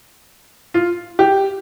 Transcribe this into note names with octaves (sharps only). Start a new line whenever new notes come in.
F4
G4